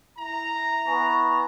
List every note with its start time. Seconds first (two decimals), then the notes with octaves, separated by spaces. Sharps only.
0.19 E4 A#5
0.88 B3 G#5 C#6